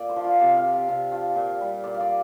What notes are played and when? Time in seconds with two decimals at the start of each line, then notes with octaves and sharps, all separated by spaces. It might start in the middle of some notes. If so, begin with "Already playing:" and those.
Already playing: A#2 D5
0.09 C5
0.16 F3
0.24 F4
0.40 C3 G4
0.57 F5
0.65 F3
0.73 F5
0.89 C3
1.12 F3
1.36 A#2
1.61 G3
1.84 A#2 D5
1.94 F5
2.00 D5